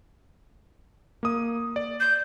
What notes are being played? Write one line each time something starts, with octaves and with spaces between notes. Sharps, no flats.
A#3 D#6
D5
G6